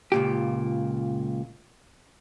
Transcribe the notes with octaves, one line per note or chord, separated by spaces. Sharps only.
C#2 A#2 G4